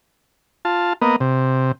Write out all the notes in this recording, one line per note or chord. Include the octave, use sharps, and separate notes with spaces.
F4 A5
A#3 B3 D#5
C3